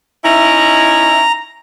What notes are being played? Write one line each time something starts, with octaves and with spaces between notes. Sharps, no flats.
C#4 D#4 E4 A#5